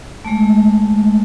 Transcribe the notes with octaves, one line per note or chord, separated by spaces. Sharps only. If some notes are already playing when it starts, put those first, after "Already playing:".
G#3 A3